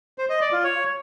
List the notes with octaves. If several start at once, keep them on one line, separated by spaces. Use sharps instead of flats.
C5
D#5
D5
F4
C#5